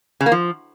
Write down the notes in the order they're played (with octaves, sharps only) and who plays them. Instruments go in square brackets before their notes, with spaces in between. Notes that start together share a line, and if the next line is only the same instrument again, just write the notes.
[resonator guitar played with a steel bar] C#3
A#3
F3